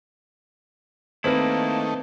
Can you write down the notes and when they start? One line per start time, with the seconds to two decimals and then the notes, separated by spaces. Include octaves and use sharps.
1.24 D#3 A3 A#3 C4 E4 B4